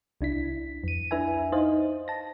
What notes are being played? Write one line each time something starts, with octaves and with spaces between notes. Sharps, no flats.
C2 D4 E4 B6
F2 D#7
D4 E4 B4 E5 G#5
D#4 C5 D#5 F5
A5 A#6